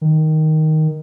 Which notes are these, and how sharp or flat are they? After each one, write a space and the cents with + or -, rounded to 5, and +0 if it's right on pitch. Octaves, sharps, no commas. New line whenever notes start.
D#3 +5